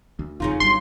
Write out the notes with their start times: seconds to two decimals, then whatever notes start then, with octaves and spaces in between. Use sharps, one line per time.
0.19 D2
0.40 D#1 F2 C#3 D#4 F4
0.60 G1 G2 F#3 C6